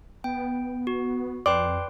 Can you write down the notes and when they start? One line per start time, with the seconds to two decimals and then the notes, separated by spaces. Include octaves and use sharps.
0.24 B3 G5
0.87 F#4
1.46 F2 B4 D5 G5 C6